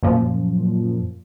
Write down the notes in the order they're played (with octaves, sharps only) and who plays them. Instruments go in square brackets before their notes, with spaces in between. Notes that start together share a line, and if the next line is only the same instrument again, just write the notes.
[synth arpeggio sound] F#2 A#2 F3